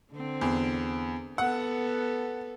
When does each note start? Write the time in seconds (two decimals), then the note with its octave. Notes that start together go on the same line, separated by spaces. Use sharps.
0.12 D3 C4
0.41 E2
1.38 B3 A4 F#5